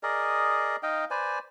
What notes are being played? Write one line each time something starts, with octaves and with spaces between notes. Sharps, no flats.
G#4 A#4 D5 D#5
D#4 D#5 F5 G5
B4 C5 D5 G#5